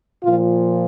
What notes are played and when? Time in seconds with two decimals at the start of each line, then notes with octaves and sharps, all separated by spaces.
0.24 A#2 F3 F4